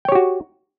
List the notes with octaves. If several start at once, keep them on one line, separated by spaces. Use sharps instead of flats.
F#4 G4 C#5 G5